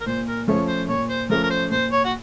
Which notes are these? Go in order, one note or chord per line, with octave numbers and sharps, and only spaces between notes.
A#4
A#2 C5
A#4
F3 A3 C#4 C#5
C5
A#2 C#5
C5
F3 A3 C#4 A#4
A#4
C5
A#2 C5
C#5
F#4